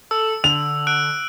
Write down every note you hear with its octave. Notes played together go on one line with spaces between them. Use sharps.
A4 E6
D3 F7
E6 F#6 D7